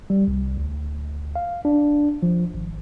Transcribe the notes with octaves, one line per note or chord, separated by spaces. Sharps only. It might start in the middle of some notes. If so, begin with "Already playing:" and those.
G3
C2
D2
F5
D4
F3
G#1